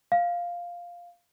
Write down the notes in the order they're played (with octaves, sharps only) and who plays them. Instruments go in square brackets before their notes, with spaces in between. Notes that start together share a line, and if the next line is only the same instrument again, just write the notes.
[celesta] F5